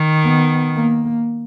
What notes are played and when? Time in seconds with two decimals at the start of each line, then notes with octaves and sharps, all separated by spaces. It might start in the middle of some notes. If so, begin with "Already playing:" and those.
Already playing: D#3
0.24 B3
0.76 A#3